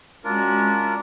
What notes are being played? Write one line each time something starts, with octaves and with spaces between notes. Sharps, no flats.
G#3 C#4 D4 F4 F#4 A#4